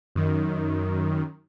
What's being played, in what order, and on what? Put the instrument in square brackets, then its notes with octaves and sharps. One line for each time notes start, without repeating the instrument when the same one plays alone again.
[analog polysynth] F#2 D#3